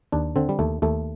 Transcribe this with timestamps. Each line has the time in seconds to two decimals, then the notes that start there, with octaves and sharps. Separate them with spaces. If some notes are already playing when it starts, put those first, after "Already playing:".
0.12 D#2 D4
0.36 D3 C4
0.49 G3
0.59 D#2 A3
0.82 D#2 A3